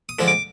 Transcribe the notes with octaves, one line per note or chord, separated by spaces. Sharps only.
D#6
D3 F3 G#3
D6